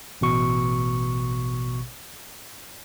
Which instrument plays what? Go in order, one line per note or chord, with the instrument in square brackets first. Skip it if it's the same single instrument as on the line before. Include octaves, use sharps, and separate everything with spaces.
[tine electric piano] A1 B2 C#6